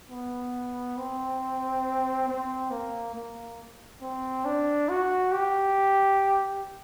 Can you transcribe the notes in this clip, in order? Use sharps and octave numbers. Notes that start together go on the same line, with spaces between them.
B3
C4
C4
A#3
A#3
C4
D4
F#4
G4